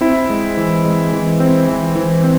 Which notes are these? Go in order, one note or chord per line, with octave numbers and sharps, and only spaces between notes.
C4 E4
G#3
E3
G#3
E3
C4
E3
E3
C4